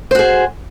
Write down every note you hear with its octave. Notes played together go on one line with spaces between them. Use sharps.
F#4 G#4 C5